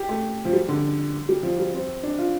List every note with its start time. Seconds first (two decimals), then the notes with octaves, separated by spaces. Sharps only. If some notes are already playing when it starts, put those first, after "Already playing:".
Already playing: G4
0.09 A3
0.45 F3
0.53 G3
0.68 D3
1.29 G3
1.43 F3
1.59 G3
1.74 C4
2.03 D4
2.18 F4